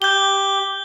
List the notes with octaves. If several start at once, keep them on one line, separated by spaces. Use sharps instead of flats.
G4 G6 G7